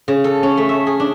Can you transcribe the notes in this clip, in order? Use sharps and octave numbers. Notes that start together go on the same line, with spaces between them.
C#3
A4
C#4
A3
E5
G#4
D4